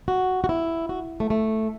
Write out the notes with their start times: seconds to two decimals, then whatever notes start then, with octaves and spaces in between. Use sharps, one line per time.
0.08 F#4
0.44 F#4
0.49 E4
0.89 F#4
1.20 A3
1.30 A3